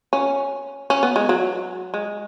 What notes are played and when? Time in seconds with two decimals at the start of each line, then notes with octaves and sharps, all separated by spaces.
0.13 C#4
0.90 C#4
1.03 B3
1.16 G#3
1.29 F#3
1.94 G#3